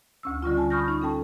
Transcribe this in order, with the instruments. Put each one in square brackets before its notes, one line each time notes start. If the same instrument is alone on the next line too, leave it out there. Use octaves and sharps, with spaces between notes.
[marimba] D2 C#4 E6
D3 G3 C#4 F4
G#5 A5
B5 C#6 D#6 F6 G6 A#6
D#4 C#6
C#4 A4 G5 A5